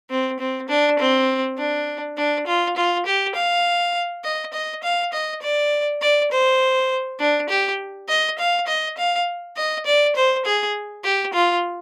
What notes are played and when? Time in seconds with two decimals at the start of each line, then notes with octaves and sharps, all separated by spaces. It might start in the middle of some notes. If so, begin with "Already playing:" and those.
0.10 C4
0.39 C4
0.69 D4
0.99 C4
1.58 D4
2.17 D4
2.47 F4
2.77 F4
3.06 G4
3.35 F5
4.24 D#5
4.53 D#5
4.83 F5
5.13 D#5
5.42 D5
6.01 D5
6.31 C5
7.19 D4
7.49 G4
8.08 D#5
8.39 F5
8.67 D#5
8.98 F5
9.57 D#5
9.86 D5
10.16 C5
10.45 G#4
11.04 G4
11.33 F4